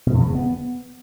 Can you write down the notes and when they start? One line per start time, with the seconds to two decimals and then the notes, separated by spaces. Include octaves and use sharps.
0.07 B2
0.14 F2
0.21 E3
0.28 C#3
0.35 B3